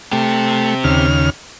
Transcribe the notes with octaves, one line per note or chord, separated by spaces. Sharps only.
A3 C4 G4
D#2 C#3 F6